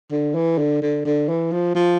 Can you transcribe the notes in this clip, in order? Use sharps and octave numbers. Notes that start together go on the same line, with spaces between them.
D3
E3
D3
D3
D3
E3
F3
F3